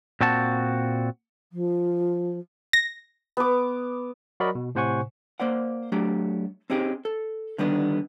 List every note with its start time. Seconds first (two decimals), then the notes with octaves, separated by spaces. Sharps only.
0.21 A#2 C4 F#4 A5
1.52 F3
2.73 A#6
3.37 B3 D6
4.40 F#3 F#4 A#4 D5 D#5 B5
4.55 B2
4.75 A2 C3 C5 F#5 G#5 C#6
5.40 A#3 C5 D5 F#5
5.92 F#3 A3 D4 G4
6.70 C4 C#4 D#4 G4 G#4
7.05 A4
7.58 D3 D#3 G3 B3 D4